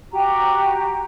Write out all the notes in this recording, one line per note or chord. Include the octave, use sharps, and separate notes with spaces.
F#4 G4 A#5